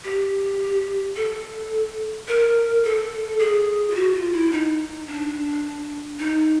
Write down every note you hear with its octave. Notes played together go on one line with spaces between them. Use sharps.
G4
A4
A#4
A4
G#4
F4
F#4
F4
E4
D#4
D4
D#4